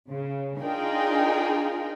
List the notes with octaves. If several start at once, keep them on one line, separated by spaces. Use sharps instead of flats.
C#3
D4 D#4 F4 G#4 A#4 G5